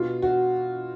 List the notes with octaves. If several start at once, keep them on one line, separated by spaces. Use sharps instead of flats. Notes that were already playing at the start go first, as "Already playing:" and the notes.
Already playing: B2 F4
F#4